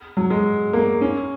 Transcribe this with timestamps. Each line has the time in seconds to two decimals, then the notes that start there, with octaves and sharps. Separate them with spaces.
0.17 F#3
0.30 G#3
0.73 A#3
1.01 C#4